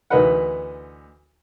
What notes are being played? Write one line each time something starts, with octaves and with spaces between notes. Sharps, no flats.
D2 E3 D#4 A#4 B4 F#5